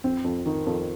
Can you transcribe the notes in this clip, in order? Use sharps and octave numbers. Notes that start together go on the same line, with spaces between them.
F2 C4
F2
D#3
F2